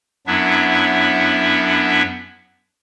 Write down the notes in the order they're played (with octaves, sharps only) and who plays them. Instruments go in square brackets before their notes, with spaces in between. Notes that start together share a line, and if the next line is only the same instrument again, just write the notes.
[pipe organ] F#2 F#3 B3 D4 E4 E5